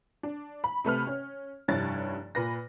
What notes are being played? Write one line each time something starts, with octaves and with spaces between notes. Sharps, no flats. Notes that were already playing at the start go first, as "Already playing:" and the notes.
D4
B5
C3 A3 B4 F6
C#4
F1 G2 E4 C#5 A6
A#2 B4 A#6